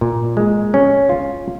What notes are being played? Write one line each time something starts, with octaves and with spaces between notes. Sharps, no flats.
A#2
G#3
C#4
F4